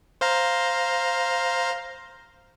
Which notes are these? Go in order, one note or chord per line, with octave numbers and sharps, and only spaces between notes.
C5 F5 A#5